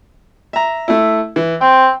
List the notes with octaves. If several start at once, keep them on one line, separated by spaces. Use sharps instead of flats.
E5 A#5
A3 E4
E3
C4 G5